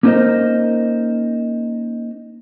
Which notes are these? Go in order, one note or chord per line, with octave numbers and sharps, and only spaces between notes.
A#3 C#4 D#4 A#4 C5 D#5